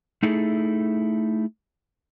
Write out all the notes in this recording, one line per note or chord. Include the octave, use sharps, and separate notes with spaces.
A3 D#4 E4 G#4 A4